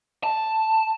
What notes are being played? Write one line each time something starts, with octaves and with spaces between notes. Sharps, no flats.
A5